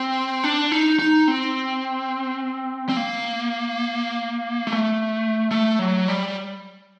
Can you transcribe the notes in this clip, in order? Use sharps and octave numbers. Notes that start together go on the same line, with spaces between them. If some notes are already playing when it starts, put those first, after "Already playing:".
Already playing: C4
D4
D#4
D#4
C4
C4
A#3
A3
A3
F#3
G3